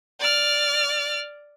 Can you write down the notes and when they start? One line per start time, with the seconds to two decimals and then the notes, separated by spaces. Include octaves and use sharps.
0.20 D5 F6